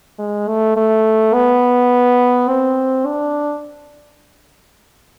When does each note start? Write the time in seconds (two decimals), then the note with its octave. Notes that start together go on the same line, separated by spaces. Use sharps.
0.19 G#3
0.47 A3
0.77 A3
1.33 B3
2.49 C4
3.06 D4